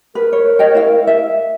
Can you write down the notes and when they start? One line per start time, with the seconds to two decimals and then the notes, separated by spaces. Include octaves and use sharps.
0.15 A#4 B4
0.32 C#5
0.59 C#5 D#5 G5
0.75 E4 F5
1.07 E5